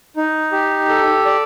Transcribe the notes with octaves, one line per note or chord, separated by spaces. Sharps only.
D#4
G4
A4
D5